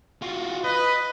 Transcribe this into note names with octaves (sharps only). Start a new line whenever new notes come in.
F4 F#4
B4 D#5